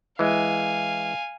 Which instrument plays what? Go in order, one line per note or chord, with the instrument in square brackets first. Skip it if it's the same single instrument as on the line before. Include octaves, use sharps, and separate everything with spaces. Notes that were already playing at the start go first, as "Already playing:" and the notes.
[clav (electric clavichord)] E3 G#3 [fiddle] F5 G#5